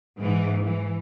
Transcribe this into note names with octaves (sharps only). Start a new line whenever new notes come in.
G#2 E3
E3